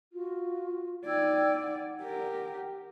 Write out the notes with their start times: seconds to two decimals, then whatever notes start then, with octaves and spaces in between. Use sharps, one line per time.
0.13 F4 F#4
1.06 D#4 D5 G5 E6 G#6
1.62 F#5
2.02 G4 A#4